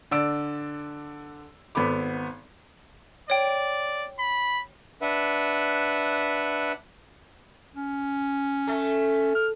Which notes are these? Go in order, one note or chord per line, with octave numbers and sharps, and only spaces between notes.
D3 D5 E6 D7
G#1 B3 A4 B5 D6
C#5 D5 G5
B5
D4 B4 E5 F#5
C#4
A3
F6